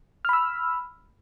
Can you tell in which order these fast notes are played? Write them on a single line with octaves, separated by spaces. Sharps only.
F6 B5 E6